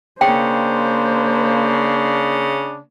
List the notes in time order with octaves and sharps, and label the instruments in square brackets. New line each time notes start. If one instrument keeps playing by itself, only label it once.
[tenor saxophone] C#3 [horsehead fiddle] A#3 C5 [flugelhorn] D4 [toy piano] G5